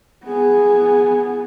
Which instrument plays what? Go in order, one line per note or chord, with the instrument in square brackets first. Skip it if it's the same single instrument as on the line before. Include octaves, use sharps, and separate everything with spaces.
[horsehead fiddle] B3 G#4